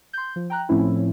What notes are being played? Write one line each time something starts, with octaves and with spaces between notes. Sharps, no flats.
C6 G6
F3
G5 A#5 F#6
A2 F3 A3 C4 C#4 E4